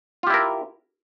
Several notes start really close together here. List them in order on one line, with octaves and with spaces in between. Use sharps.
F4 G4 E4 A#4